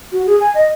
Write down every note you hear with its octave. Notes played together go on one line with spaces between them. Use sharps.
F#4
G#4
G#5
D#5